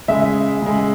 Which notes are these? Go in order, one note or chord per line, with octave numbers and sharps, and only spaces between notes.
C#3 G#3 E5
C#3 G#3